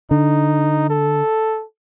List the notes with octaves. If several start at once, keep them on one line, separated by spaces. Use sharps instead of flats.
D3 D#4
A4